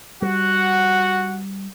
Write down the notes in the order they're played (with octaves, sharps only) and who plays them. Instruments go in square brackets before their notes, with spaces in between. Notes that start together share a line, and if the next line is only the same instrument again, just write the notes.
[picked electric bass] G3 [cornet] F#4 [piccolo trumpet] F#5